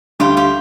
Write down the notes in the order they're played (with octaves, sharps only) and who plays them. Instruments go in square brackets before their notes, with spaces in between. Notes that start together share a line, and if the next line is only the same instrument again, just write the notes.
[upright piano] D2 D3 G3 [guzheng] F4 G4
[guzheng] F4 G4